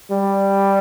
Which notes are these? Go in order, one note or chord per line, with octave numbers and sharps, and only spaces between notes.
G3